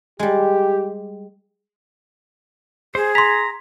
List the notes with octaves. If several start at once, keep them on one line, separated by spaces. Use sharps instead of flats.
G3 G#3 G4
G#4 C5
A#5 C6 B6